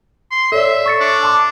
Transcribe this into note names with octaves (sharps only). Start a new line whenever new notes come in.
C6
A4 C#5 D5 E5
C#6 A6 C#7
D4
A5 C6 D6